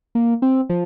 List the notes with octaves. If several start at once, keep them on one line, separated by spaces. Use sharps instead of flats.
A#3
C4
F3